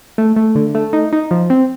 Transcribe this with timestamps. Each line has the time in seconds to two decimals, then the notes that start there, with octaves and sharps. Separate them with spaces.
0.18 A3
0.36 A3
0.55 D3
0.75 A3
0.93 D#4
1.13 D#4
1.31 F3
1.50 C4